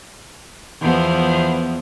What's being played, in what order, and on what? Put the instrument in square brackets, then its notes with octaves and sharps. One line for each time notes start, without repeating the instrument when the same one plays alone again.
[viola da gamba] E2 F3 B3